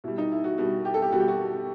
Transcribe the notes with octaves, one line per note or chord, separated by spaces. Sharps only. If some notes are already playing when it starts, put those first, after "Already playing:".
B2 G3 E4
D#4
E4
F#4
B2 G3 F#4
G4
A4
G4
B2 G3 F#4
G4
F#4